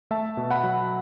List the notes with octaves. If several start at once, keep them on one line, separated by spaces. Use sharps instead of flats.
A3 E5 A5
B2
F#5 B5
F#3